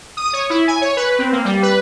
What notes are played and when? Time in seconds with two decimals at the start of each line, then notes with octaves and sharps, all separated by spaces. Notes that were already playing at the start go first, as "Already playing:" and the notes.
0.17 D#6
0.33 C#5
0.50 E4
0.67 G#5
0.82 C#5
0.97 B4
1.19 C4
1.32 A#3
1.45 G3
1.63 B4